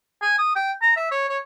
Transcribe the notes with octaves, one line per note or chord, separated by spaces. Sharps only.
G#5
D#6
G5
A#5
E5
C#5
C#5